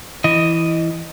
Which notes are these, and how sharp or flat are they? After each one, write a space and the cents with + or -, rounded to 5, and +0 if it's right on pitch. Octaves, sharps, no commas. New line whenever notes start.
E3 +0 D#5 +0